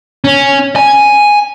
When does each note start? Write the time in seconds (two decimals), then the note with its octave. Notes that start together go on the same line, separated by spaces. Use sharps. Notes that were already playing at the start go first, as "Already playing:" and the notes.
0.24 C#4
0.76 G#5